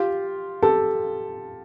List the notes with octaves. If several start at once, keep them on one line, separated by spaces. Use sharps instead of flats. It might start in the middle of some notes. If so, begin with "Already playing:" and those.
Already playing: F4 G4
G4 A4